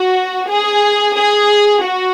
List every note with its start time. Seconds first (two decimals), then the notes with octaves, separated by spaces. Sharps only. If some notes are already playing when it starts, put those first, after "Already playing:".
Already playing: F#4
0.49 G#4
1.16 G#4
1.83 F#4